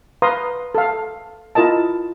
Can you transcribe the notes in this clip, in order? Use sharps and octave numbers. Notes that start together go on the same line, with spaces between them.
B4 F5 A#5 C6 D#6
A4 F5
E4 F4 A#4 D#5 A5